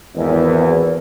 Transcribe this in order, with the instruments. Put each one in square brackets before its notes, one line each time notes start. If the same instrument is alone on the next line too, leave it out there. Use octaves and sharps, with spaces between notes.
[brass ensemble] G#1 E2